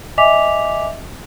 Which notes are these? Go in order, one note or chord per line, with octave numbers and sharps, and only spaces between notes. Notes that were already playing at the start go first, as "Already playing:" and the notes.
D#5 E5 G#5 D6 B6 F7